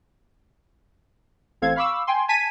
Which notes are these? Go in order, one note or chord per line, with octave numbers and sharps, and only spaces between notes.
A1 C4 A4 F5 G#6
F5 B5 C#6 D6 E6
G5 G#5 C6
G#5 A5 G#6 B6 D#7